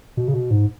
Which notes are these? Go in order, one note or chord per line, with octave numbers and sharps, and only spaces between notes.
B2
C#3
B2
G#2